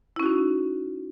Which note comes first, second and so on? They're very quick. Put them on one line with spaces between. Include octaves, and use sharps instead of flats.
E4 C#4 F#4 D#4